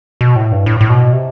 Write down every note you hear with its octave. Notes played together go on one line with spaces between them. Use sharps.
B2
A2
G2
A2
A2
B2
C3